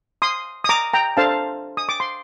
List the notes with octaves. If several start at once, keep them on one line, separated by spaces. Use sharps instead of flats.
C6 D#6
D#6
A#5 D6
G5 A#5
D4 A4 C5 F5 A5
D#6
D6
C6